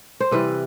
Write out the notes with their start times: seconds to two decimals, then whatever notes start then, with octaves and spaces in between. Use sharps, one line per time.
0.20 C5
0.31 C3 E3 G3 B4